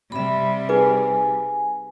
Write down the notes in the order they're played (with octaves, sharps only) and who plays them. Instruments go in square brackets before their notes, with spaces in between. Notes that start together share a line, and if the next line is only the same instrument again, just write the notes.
[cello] C3 G3 [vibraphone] E5 B5
[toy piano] D#4 G#4 B4 [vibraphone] G#5